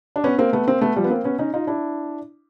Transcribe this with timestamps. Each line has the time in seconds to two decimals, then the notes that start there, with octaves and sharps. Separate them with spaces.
0.16 D4
0.24 B3 C#4
0.38 A#3 C4
0.53 A3 B3
0.67 A#3 C4
0.81 A3 B3
0.96 F3 G3
1.04 B3
1.10 A#3 C4
1.24 B3 C#4
1.39 C#4 D#4
1.54 D#4 F4
1.67 D4 E4